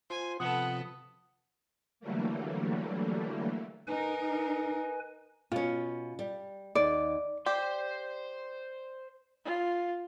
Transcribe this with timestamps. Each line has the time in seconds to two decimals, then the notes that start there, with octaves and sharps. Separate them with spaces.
0.10 F4 C5 G#5 C6
0.40 C3 F3 B3 A4 F#5 D#6
2.00 D3 E3 F#3 G3 A3 A#3
3.87 D#4 A#4 B4 G#5
5.52 B2 C#4 F4
6.19 G3
6.75 D#2 D5
7.46 G4 C5 D5 C6
9.45 F4